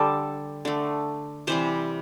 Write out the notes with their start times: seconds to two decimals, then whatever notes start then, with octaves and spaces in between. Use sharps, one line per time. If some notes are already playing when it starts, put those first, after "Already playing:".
Already playing: D3 G3 A4
0.65 D3 A3
1.47 C3 E3 G3 C5